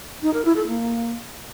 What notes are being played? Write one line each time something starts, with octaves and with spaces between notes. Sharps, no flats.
D#4
A#4
E4
A4
A#3